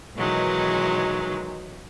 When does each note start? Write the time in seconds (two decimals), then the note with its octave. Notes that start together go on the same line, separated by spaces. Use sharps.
0.16 B2 D#3 E3 F#3 G#3 D#4